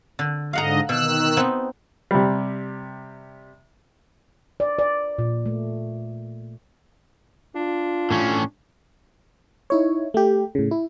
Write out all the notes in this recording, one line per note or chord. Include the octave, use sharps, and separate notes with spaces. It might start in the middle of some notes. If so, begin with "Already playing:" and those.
D3
G#2 D3 D#5 F5 F#5 A#5
B2 D#3 E6 F#6
B3 C4 D#4
C3 G3
D5
D5
A#2
A3
D4 F4
A2 C#4
D#4 E4 C#5
A3 G4
A2 C#3
E4